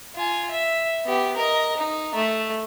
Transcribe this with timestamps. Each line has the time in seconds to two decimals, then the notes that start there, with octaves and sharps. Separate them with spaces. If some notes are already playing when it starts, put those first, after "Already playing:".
0.16 F4 G#5
0.51 E5
1.06 B3 G4
1.36 A#4 D#5
1.77 D#4
2.15 A3